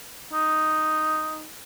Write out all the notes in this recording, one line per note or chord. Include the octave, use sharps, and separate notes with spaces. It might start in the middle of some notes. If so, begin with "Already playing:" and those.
D#4